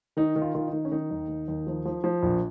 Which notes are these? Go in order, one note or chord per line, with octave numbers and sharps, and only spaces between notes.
D#3 D#4
D#3
F4
D#3 F4
D#4
D#3
C#4
D#3 D#4
D#2
D#3
D#2
F3
F3
F3
A#1